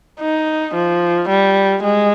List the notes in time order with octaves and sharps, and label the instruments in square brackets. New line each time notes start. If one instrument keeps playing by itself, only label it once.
[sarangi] D#4
F3
G3
G#3